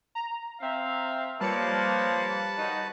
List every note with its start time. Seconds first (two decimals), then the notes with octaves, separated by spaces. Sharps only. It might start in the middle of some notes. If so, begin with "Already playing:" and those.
0.15 A#5
0.61 C4 E5 F5
1.41 F3 G3 A#3 B4 C#5 A5 F#6 C#7
2.58 D#3 D#4 F#4